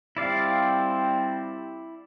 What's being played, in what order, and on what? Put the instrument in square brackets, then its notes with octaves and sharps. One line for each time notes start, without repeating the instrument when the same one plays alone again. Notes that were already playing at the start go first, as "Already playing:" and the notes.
[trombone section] G3 C4 [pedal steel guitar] E4 D5 F5